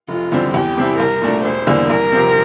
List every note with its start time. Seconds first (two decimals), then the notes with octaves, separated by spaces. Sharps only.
0.08 F1 F4
0.32 E2 D3 G3 C4
0.54 E2 G4
0.77 C3 G3 C4 E4
0.99 C2 A#4
1.22 A#2 A3 D4
1.44 E1 C5
1.67 E2 D3 G3 A#3
1.90 C2 A#4
2.12 C3 F3 C4